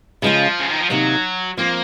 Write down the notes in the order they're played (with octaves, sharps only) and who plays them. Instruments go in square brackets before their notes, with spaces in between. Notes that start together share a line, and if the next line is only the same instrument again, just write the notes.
[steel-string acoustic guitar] C#3 G#3 C#4 F4 [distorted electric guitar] F3
[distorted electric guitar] C#3
D#3
F3
[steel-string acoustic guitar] C3 D#3 A#3 [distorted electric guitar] F#3
[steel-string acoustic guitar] F3 C4 F4 [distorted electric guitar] A#3